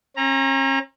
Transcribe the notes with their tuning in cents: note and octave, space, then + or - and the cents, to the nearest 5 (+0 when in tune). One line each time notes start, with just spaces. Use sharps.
C#4 -40 A#5 +0